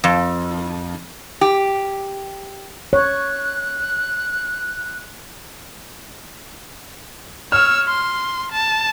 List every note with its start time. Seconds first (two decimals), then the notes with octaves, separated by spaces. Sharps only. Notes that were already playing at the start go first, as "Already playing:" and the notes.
0.04 F2
1.41 G4
2.93 C#5 F#6
7.52 C#5 E6 F6
7.88 C6
8.52 A5